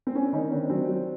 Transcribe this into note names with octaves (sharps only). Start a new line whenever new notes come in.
C4
C#4
D4
D#3 C#4 D#4
D#3 C4 D4
F#3 C4 D4
F#3